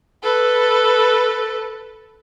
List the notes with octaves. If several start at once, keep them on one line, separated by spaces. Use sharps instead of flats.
A4 B4